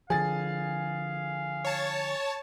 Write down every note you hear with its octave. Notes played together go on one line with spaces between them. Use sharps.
D3 F3 G#4 F5 A6
C#5 A5